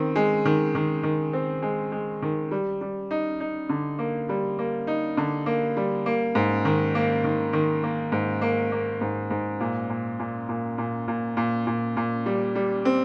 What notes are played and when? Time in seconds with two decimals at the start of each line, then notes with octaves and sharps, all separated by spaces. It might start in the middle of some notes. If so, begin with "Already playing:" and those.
Already playing: D#3 C4
0.16 G#3
0.45 D#3
0.75 D#3
1.03 D#3
1.33 C4
1.62 G#3
1.92 G#3
2.22 D#3
2.51 G3
2.81 G3
3.11 D#4
3.40 D#4
3.69 D3
3.99 A#3
4.29 G3
4.59 A#3
4.87 D#4
5.17 D3
5.46 A#3
5.77 G3
6.06 A#3
6.35 G#2
6.65 D#3
6.95 A#3
7.24 D#3
7.53 D#3
7.83 A#3
8.12 G#2
8.42 A#3
8.72 A#3
9.01 G#2
9.31 G#2
9.60 A#2
9.90 A#2
10.19 A#2
10.49 A#2
10.78 A#2
11.08 A#2
11.37 A#2
11.67 A#2
11.97 A#2
12.26 G3
12.55 G3
12.85 C4